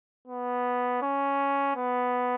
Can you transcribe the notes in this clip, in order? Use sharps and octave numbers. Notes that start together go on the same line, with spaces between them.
B3
C#4
B3